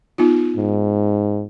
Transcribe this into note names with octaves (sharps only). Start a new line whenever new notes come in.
B3 D#4 F4
G#2